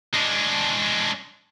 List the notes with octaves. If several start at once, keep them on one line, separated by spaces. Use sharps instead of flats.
G#3 D4